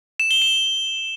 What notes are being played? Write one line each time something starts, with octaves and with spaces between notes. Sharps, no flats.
E7
G7
E7